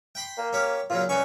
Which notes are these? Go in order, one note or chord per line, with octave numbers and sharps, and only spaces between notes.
G5 B5 C6
A#3
C#4 G4
A#2 C#3 F#3 F4
C2 B3 C#4 C#6